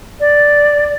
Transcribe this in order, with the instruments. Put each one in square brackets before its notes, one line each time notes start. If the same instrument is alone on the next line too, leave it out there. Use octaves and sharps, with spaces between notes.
[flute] D5